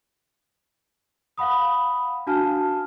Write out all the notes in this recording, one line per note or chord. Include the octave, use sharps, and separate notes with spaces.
F5 F#5 B5 D#6
D4 F#4 F5 G#5 A5 F6